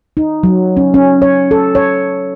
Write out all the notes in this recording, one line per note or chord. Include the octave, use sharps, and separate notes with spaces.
D#4
F#3
C#4
C#4
C#5
A4
C#5